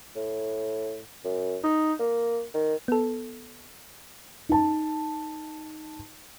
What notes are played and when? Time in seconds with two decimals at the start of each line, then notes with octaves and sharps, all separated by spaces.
0.15 A2
1.25 F#2
1.64 D#4
1.99 A#3
2.54 D#3
2.88 B3 A4
4.49 D#4 A5